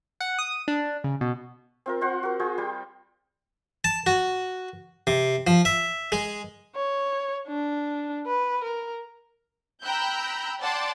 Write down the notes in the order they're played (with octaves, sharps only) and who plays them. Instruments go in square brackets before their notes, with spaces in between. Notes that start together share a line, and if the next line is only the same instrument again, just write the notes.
[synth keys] F#5
D#6
D4
C#3
B2
[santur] C4 F4 A#4
F4 C5 F#5
F#4 A#4
F4 G#4 G5
G3 G4 G5
[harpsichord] A5
F#4
C3
F3
E5
G#3
[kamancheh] C#5
D4
B4
A#4
[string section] G5 A#5 B5 E6 F#6 G6
D5 F#5 G5 A5 C6 D6